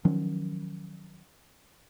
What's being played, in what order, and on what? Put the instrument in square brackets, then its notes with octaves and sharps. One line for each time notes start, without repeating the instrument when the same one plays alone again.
[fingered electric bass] D#3 F3 F#3 C#4